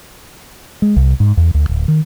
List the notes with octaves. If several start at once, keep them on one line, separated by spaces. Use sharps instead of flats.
G#3
C2
G#2
E2
D2
D1
D#3